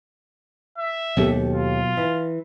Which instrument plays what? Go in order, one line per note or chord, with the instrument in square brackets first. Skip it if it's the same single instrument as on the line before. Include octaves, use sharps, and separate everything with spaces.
[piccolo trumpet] E5
[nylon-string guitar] D#2 G4 A4 [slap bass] B2 F#3 B3
[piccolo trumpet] F4
[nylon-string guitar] E3